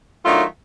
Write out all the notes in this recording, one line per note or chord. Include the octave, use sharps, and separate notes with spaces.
D#3 F#3 A3 D4 F4